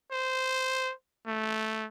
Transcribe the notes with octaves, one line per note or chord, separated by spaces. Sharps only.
C5
A3